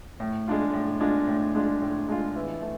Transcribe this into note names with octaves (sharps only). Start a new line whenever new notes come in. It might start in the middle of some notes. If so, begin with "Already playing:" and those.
A2
G#3 D4 F4
A2
G#3 D4 F4
A2
G#3 D4 F4
A2
G#3 D4 F4
E3
A3